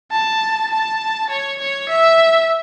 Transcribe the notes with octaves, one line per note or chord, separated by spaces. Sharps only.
A5
A5
C#5
C#5
E5